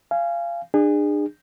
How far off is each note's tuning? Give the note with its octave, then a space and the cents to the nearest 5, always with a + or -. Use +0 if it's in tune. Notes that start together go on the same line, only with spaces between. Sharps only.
F5 -25 G#5 +0
D4 +35 G#4 -25